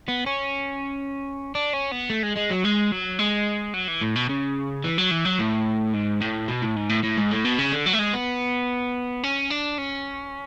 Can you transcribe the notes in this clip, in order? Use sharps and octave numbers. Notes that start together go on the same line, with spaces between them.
B3
C#4
D4
C#4
B3
A3
G#3
G#3
F#3
G#3
F#3
G#3
F#3
E3
A2
B2
C#3
E3
F#3
E3
F#3
A2
G#2
A2
B2
A2
G#2
A2
A2
G#2
A2
B2
C#3
D3
F#3
A3
G#3
B3
C#4
D4
C#4